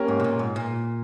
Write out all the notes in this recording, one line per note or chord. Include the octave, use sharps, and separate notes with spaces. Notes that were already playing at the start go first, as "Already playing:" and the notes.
Already playing: A#3 C#4 G4 A#4
G#2
C3
A#2
G#2
A#2